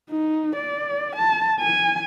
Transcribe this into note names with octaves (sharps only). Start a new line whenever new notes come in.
D#4
D5
A5
G#5